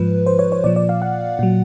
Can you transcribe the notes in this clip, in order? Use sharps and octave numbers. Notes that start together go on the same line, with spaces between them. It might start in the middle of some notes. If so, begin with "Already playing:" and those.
Already playing: G#2 F3 B4
C5
C#5
C#5
A#2 F3 D5
D5
F5
F#5
A#2 F#3